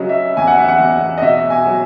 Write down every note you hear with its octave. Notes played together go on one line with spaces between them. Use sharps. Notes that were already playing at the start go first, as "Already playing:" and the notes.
Already playing: C#3 F#3 D#5
E5
E2 G#5
F#5
E5
F#5
E2
D#5
B2 E5
G#5
F#3